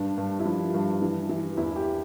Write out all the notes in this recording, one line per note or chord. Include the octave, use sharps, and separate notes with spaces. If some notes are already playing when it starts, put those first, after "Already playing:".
Already playing: G2 D4
G2
E4
F3 D4
G2
E3
E3
E2 E4
G4